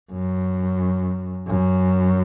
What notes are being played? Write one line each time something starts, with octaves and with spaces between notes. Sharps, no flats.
F#2
F#2